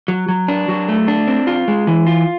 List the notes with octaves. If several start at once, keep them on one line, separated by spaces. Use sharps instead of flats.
F#3
F#3
D4
F#3
A3
D4
C4
F4
G#3
E3
F4